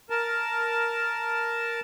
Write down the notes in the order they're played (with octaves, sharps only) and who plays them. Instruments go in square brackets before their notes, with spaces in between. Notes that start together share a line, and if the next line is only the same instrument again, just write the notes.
[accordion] A#4 A5